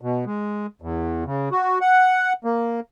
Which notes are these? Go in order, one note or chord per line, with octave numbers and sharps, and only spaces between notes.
B2
G#3
E2
C#3
F#4
F#5
A#3